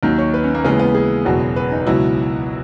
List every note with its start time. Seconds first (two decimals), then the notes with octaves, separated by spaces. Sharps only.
0.03 D#2 D#3 F#3
0.18 C#5
0.34 B4
0.44 C#4
0.55 A#3
0.64 D#2 C#3 E3 G#3 B3
0.79 B3
0.95 G#4
1.25 F#1 E2 B2 F#3
1.56 B4
1.71 D#4
1.87 C#2 B2 F#3 E4